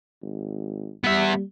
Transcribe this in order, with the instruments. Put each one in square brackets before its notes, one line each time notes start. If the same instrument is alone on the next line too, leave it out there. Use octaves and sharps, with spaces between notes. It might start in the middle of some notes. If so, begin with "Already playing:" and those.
[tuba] G#1
[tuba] G3 [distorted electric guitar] B3 E5